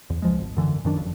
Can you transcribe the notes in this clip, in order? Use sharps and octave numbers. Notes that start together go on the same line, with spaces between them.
E2
C#2 F3 G#3
G#1
F#2 D3 E3
F#2 D#3 D4
F#1 F2